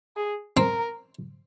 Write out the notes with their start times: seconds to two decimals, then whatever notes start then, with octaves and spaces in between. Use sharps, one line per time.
0.16 G#4
0.57 C4 A#4